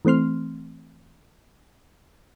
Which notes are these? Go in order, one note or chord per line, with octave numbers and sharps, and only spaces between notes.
E3 A3 C4 C6 F6